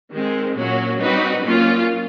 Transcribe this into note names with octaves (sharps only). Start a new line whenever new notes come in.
D#3 G#3 C4
A#2 F#3 A#3 C#4 F#4
G3 C4 D#4 F#4 B4
A#2 F#3 A#3 C#4 F4